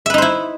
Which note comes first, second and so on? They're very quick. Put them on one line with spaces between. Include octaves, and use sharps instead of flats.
E5 B4 D#4 C5 E4